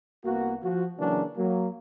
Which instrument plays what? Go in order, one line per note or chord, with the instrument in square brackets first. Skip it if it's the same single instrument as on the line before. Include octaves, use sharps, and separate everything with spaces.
[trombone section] C2 A#3 B3 F#4
F3 F#4
C#3 E3 F#3 A#3 C#4 D4
F#3 A#3